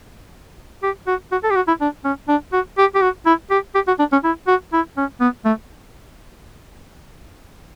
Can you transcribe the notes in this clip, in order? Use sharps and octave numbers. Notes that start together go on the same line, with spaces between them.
G4
F#4
F#4
A4
G4
F#4
E4
D4
C#4
D4
F#4
G4
G4
F#4
E4
G4
G4
F#4
D4
C#4
E4
F#4
E4
C#4
B3
A3